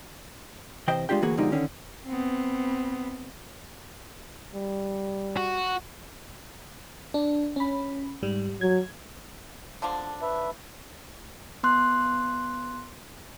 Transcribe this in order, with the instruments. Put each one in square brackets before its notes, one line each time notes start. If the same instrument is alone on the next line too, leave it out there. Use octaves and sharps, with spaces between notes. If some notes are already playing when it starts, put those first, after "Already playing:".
[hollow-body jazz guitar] C3 E3 C5 D#5 G5
G#3 A3 D4 F4 G4 G5
D2 A2 E3 A#3 F#4 G#4
B2 D3 F3 G#3 D#4 G4
D3 D#3 C#4
[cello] B3 C4
[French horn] G3
[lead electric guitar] F#4
[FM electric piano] D4
C#4 B5
G#2 G3
[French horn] F#3 [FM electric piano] G#6
[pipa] D3 F3 D4
[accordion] B4 E5
[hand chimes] B3 C6 F#6